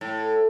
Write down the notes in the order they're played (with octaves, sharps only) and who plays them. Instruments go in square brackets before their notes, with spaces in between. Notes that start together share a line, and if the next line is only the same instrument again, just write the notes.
[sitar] A2